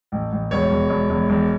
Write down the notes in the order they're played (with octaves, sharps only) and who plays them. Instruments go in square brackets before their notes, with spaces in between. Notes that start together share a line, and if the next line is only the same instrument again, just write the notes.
[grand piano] A1
A1
E1 C#5
E1
E1
E1
E1